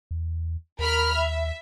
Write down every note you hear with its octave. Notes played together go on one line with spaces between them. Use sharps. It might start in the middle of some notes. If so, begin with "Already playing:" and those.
E2
D#2 A#4 B5 F6
E5